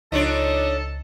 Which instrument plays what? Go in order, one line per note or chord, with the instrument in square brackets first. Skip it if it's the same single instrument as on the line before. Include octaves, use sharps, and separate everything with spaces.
[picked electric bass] C#2 [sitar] F3 D4 C#5 [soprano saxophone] D#4 [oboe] A4